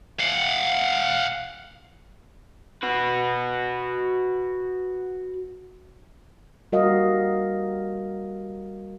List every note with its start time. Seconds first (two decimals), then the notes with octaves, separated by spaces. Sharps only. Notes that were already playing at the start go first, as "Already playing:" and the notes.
0.20 F5 F#5
2.83 F#4 B4
6.72 G3 F#4 A#4 D#5 F5